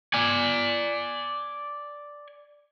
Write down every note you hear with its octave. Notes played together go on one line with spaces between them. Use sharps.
D5 G#5